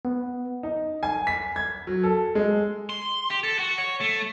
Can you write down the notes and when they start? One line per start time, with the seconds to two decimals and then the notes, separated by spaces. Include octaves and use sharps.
0.05 B3
0.63 D#4
1.03 G#5
1.27 B6
1.56 G#6
1.87 F#3
2.03 A4
2.35 G#3
2.90 C6
3.30 G4
3.44 A4
3.59 F#4
3.78 C#5
4.01 A3